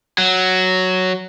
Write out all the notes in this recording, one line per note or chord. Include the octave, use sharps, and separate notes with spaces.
F#3